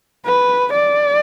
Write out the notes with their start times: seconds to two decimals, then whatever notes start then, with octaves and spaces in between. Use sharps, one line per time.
0.26 B4
0.73 D5